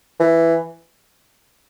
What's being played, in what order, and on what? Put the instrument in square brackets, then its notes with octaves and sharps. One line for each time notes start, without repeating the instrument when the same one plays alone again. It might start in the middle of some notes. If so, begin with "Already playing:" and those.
[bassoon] E3